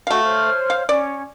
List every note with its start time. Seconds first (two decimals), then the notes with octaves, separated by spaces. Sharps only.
0.07 A3 F#4 C#5 F5
0.23 C5 C#5 F6
0.70 F5
0.89 C#4 D5